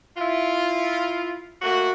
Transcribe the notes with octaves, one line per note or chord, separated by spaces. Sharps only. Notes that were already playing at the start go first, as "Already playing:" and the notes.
E4 F4
A3 A#3 F#4